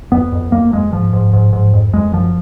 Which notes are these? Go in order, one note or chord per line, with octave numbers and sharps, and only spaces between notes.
F2 B3
F2
F2 A#3
F2 G#3
G#2 F3
G#2
G#2
G#2
F2
F2 G#3
F#2 F3